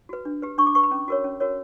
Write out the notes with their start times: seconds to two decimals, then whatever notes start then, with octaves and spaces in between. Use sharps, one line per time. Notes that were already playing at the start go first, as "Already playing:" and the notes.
0.09 F#4 B4
0.25 D4
0.42 G4 B4
0.58 D4 C#6
0.66 D6
0.75 G4 B4 C#6
0.83 B5
0.91 C#4
1.08 F#4 A#4 C#5
1.24 C#4
1.40 F#4 A#4 C#5